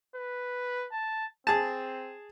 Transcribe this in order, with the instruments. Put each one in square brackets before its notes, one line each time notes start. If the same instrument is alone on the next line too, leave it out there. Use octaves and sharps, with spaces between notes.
[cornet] B4
A5
[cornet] C4 [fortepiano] G#4 A5